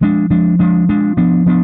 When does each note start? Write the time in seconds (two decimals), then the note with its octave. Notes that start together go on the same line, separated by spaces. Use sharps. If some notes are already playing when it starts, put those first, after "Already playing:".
0.01 F3 G#3 D4
0.30 F3 G#3 D4
0.59 F3 G#3 D4
0.89 F3 G#3 D4
1.17 F3 B3 D4
1.46 F3 B3 D4